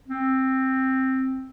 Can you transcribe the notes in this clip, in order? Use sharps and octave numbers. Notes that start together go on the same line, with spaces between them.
C4